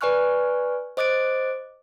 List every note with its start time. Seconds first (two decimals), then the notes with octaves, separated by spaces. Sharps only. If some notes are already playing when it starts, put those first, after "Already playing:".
0.01 B4 D5 G#5 C#6 F6 F#6
0.97 C5 D#5 D6 F#6 A6 D7